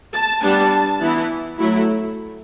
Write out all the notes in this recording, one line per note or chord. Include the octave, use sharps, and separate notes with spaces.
A5
G3 B3 D4 A5
E3 B3 E4
F#3 A3 E4